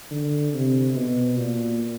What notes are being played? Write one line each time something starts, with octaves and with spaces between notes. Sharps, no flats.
D3
C3
B2
A#2